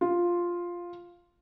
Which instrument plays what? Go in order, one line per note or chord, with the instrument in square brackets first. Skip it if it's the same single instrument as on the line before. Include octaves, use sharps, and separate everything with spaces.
[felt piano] F4